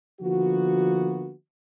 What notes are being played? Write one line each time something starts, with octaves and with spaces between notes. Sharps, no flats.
D3 F3 A#3 B3 F#4